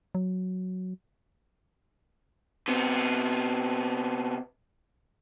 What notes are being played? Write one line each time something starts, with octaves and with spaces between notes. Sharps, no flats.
F#3
C3 B3